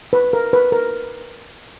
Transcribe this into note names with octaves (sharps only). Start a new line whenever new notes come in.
B4
A#4
B4
A#4